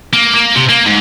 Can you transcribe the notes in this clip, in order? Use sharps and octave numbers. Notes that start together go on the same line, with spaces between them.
A#3
A#3
C3
A#3
G#2